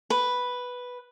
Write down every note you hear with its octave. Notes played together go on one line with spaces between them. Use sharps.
B4